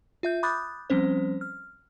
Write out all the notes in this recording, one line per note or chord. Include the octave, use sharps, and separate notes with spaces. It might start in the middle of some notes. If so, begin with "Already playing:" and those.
F4 E5 G6
B5 D6 D#6 F#6 G6 A6
F3 G3 C4 C#4 C5
F6